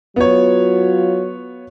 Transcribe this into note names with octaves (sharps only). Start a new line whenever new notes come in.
F#3 B3 F4 C#5